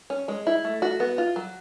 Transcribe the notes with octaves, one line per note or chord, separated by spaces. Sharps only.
C#4
G#3
E4
A3
F#4
B3
F4
F#3